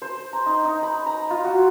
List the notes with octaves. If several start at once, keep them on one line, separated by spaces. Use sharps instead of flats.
C5
A#5
D#4
D#4
B5
A#5
F4
F#4